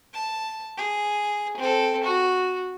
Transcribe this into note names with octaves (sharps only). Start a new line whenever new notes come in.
A5
G#4
C4 A4
F#4